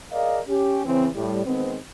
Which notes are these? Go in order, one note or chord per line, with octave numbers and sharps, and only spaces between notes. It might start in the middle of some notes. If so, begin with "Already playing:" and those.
G#4 A#4 D5 D#5 F5
C#4 G4
C#3 E3 C4
A2 G3
D#3 G#3 B3 C4